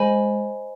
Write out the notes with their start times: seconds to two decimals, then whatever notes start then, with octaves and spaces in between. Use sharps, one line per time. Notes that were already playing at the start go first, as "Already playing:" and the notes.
Already playing: G#3 C5 D#5 G#5 B5